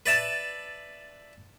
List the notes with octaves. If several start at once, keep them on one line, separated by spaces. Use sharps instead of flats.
B4 D5 E5 A5